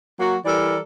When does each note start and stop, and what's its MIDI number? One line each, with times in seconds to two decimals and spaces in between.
0.19 0.36 54
0.19 0.36 58
0.19 0.36 66
0.45 0.78 52
0.45 0.78 55
0.45 0.78 69
0.45 0.78 70
0.45 0.78 74